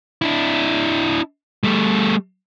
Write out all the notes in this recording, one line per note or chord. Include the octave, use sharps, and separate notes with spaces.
D4 E4
G3 A3